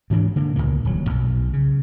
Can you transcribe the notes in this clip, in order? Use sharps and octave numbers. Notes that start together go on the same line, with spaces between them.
D2 G#2 E3 D4
D3 A#3
C#2 G2 A#2 A#3
D#1 F#3
B1 B2
C#3